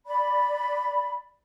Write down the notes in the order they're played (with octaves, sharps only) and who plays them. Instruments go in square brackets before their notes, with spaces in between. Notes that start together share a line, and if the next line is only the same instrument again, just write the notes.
[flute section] D5 B5